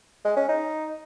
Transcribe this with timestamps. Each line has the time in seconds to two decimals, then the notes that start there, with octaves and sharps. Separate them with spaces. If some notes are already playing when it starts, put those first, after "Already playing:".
0.25 G#3
0.37 C#4
0.49 D#4